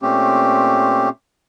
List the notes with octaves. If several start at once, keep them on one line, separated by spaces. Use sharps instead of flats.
A#2 A3 C4 C#4 G4